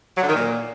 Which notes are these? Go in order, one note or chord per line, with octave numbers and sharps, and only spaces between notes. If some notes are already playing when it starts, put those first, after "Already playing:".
F#3
D3
D#3
A#2